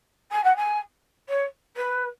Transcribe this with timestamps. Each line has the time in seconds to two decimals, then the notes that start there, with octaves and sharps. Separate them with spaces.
0.31 G#5
0.44 F#5
0.56 G#5
1.29 C#5
1.76 B4